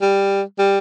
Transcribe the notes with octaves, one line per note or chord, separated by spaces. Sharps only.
G3
G3